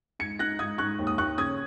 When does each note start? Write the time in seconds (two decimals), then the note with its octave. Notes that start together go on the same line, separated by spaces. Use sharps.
0.19 G#2 G#6 C#7
0.39 D#4 F#6 A#6
0.59 G#2 D#6 G#6
0.78 G#2 C#6 F#6
0.99 D#2
1.07 D#6
1.18 D#2 C#6 F#6
1.37 C#3 D#6 G#6